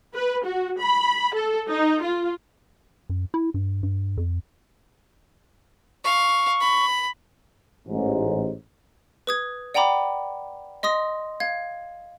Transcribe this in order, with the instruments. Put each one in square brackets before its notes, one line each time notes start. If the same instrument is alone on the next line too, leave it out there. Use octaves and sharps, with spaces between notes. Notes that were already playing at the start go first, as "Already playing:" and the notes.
[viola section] B4
F#4
B5
A4
D#4
F4
[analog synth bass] F#2
E4
G2
G2
F2
[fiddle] F5 [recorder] C#6
[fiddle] B5
[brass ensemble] A1 G#2
[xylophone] B4 D#6 G#6
D5 F#5 G5 A#5 B5 D6
D#5 C6 D#6 A#6
F5 G#6